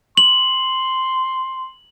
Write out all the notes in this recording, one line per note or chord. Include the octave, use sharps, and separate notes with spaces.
C6 F#7